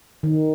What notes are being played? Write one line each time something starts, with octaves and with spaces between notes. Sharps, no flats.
D#3